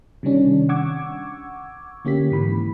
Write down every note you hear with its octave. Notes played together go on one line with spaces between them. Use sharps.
C3 D#3 G3 C#4 D4
F#5 C#6 D6 E6 G#6
D3 A#3 C#4 G4 B6
G#2 E3 B5